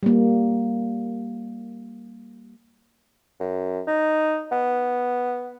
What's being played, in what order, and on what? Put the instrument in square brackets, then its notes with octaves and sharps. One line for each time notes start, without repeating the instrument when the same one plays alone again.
[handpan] G3 A#3
[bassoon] F#2
D#4
B3